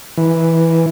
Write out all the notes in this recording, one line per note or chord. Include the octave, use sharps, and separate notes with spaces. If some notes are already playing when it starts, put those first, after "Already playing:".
E3